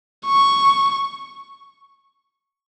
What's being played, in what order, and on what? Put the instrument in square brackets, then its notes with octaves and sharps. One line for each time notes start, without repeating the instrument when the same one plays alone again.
[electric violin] C#6